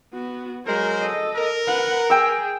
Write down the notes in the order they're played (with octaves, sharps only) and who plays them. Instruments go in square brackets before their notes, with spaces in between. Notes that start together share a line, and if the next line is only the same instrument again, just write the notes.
[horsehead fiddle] B3 F#4
[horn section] F#3 G#3 C5 [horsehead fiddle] A#4
[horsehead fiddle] A4 D#5
[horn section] A#4
[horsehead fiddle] B4 F#5
[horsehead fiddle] G#4 [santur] G5 E6